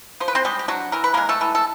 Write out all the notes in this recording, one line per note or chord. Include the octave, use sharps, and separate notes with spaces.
F3 C5
B4
C4 C5
G3 G#3 G4
G4
F#3 D4 F#4
E3 A#4
B4
G#3 A#3 A#4
A3 A4
E3
A4